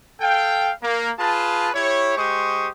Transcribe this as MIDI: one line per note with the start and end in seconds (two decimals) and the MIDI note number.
0.21 0.71 69
0.21 0.71 77
0.21 0.71 79
0.83 1.11 58
1.19 1.70 65
1.19 1.70 68
1.19 1.70 71
1.19 1.70 81
1.74 2.16 64
1.74 2.16 67
1.74 2.16 73
2.18 2.68 56
2.18 2.68 67
2.18 2.68 72
2.18 2.68 85
2.18 2.68 87